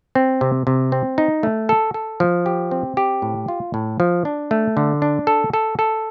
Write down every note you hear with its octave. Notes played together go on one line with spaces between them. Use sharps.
C4
C3
C3
C4
D#4
A3
A4
A4
F3
G4
C4
G4
A2
F4
A2
F3
D4
A3
D3
D4
A4
A4
A4